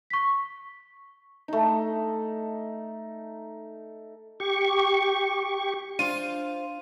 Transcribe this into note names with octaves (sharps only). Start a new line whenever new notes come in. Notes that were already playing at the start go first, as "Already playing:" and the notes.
C#6 B6
A3 D#4
G4 C#6
D4 F4 C5 D#7